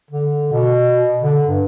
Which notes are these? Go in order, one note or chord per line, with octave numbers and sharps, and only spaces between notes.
D3
B2
D3
G2